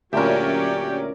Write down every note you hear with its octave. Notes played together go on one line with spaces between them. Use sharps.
D2 A#2 F#3 C#4 G4 A#4 D5 E5